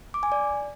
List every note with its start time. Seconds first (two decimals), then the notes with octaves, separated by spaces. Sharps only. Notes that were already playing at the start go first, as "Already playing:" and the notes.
0.14 D6
0.23 G#5
0.32 D5